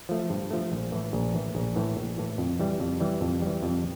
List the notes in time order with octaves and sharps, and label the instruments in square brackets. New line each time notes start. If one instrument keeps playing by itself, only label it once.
[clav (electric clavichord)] F3 A3
G2
F3 A3
A#1
A2 E3
A#1
A2 E3
A#1
A2 E3
A#1
A2 E3
F2
E3 G3
F2
E3 G3
F2
E3 G3
F2